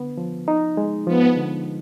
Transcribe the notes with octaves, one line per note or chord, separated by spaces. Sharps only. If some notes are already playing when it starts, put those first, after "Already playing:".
Already playing: D3 B3
F3
D#4
G#3
F3 B3
D3